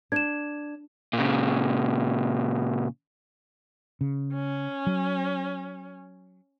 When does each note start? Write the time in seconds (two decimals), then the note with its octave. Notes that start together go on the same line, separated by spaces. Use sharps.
0.12 D4 G#6 E7
1.13 A#2 C#3
4.01 C#3
4.33 C#4
4.87 F#3